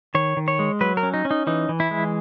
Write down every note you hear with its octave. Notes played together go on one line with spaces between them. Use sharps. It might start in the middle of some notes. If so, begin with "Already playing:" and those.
D#3 C#5
D#3
C#5
G#3
F#3 B4
A#4
C#4
D#4
C#4
D#4
E3 D#4
E3
E4
G#3